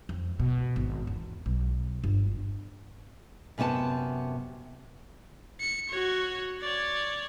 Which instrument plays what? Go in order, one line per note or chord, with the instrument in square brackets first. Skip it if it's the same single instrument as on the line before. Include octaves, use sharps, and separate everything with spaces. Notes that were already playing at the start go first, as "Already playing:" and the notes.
[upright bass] F2
B2
G#1
E2
B1
G1
[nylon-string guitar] F#2 C3 B3 G#5 A5
[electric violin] C#7
F#4 C#5
C#5 D5